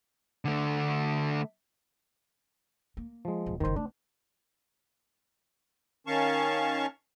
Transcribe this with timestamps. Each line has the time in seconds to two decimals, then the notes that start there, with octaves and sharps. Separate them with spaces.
0.45 D3 A3
2.97 A#3
3.25 F3 G#3
3.46 D#1
3.60 F#1 F#2 D#3 C5
3.76 A3 D4
6.07 D#3 C#4 F5 A5 C#6